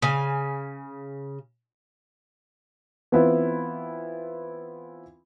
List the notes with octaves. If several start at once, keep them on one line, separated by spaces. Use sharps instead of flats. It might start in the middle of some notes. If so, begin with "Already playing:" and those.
C#3 G#5
E3 B3 C4 E4 F4